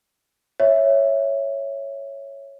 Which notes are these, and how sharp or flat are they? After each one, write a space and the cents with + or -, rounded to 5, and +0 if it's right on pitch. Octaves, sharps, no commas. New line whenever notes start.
C#5 +0 E5 +0